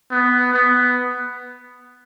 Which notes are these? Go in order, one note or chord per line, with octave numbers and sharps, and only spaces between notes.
B3
B3